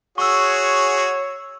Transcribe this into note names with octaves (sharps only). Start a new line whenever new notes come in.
F#4 G#4 C#5 C#6 E6